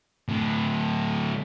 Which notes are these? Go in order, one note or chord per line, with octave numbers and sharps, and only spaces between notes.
A2 D3